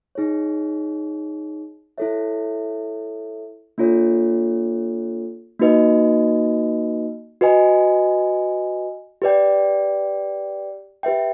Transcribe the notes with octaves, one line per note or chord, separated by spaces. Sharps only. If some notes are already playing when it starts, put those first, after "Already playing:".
D#4 G#4 C#5
E4 A4 C#5 E5
A#3 D4 F4 A4 C#5
A#3 D#4 F#4 B4 D#5
F#4 B4 D#5 G#5
G4 B4 D5 G5
G4 B4 E5 G5